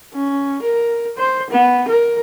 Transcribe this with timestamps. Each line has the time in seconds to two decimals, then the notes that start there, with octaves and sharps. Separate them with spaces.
0.14 C#4
0.63 A#4
1.18 C5
1.50 B3
1.88 A#4